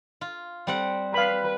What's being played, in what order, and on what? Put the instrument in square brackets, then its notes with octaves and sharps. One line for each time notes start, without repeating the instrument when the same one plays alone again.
[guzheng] F4
G3 C4 F#5
[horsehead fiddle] B4 [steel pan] F5 B5